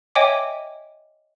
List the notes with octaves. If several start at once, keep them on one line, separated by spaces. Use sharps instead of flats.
C#5 D#5 E5 G5 G#5 D6